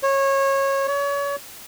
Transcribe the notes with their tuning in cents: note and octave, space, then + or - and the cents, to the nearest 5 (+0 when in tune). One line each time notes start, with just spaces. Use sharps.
C#5 -20
C#5 +35